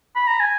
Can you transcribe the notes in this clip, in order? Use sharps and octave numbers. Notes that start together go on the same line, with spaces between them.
B5
A#5
G#5